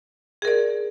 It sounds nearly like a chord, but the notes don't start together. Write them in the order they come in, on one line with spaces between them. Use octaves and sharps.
G#4 A#4 D5